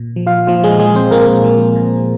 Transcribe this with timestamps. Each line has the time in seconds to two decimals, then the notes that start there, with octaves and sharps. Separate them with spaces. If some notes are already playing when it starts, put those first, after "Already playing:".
Already playing: A#2
0.16 F3
0.26 F4 F5
0.47 A#2 F3 F4
0.64 G#3 G#4
0.79 F3 G#3 G#4
0.95 C4 C5
1.11 A#2 A#3 A#4
1.44 F3
1.75 A#2